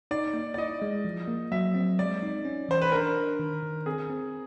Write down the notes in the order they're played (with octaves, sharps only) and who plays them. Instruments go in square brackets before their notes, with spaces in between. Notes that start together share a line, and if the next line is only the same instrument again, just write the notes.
[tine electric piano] D#4 [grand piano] D5
[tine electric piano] A#3
[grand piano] D5
[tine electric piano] E4 [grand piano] D#5
[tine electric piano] G#3
F3
A#3
[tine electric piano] F#3 [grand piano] E5
[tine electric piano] C4
[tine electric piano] G#3 [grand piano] D5
[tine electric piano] D#4
C#4
[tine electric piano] E3 [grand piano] C5
[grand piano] B4
[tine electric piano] D4 [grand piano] A#4
[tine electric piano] D4
D#3
D#3
[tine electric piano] C4 [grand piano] G#4
[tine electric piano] C4